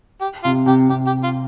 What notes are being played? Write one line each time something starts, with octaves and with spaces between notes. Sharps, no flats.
G4
C3 F4
C3 G4
C3 G4
G4
F4